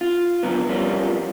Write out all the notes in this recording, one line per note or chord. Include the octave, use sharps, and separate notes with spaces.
F4
A#2 D3 F3 F#3 B3
F3 G3 A#3 B3 C#4 F4